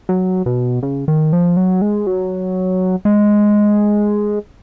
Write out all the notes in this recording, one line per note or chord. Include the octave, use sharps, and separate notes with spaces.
F#3
B2
C#3
D#3
F3
F#3
G#3
F#3
G#3